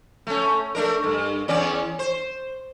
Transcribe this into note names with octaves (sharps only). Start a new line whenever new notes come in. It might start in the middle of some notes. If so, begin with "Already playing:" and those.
A3 C#4
A3 D4 A#4
G2
E2 C#4 D5
C5